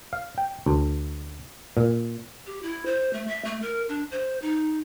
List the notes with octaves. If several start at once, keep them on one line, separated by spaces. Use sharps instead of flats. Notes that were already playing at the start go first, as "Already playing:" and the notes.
F5
G5
D2
A#2
G4
E4
C5
A3
E5
A3
A#4
D4
C5
D#4